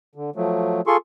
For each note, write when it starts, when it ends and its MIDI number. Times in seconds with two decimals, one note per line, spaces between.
0.15 0.30 50
0.36 0.81 53
0.36 0.81 54
0.36 0.81 57
0.87 0.97 65
0.87 0.97 68
0.87 0.97 69
0.87 0.97 84
0.87 0.97 85